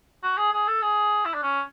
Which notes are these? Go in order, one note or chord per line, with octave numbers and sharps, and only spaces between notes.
F#4
G#4
G#4
A4
G#4
E4
D4
C#4